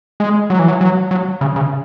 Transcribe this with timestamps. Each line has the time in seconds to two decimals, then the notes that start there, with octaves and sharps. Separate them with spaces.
0.20 G#3
0.50 F#3
0.59 E3
0.68 F#3
0.81 F#3
1.11 F#3
1.41 C#3
1.56 C#3